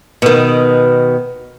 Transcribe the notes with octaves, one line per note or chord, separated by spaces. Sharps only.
B2 D#3